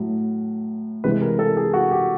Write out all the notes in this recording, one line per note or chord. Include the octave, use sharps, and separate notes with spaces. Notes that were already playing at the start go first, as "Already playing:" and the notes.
Already playing: A2 F#3
C3 E3 G#3 B4
A#4
A4
G#4
F#4
G4